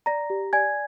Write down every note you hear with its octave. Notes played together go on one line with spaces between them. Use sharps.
D5 A#5 A#6
G4
D5 G#5 G#6